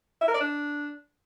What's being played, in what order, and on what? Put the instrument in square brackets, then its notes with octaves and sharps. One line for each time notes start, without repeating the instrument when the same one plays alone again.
[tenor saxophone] E5
A#4
D5
D4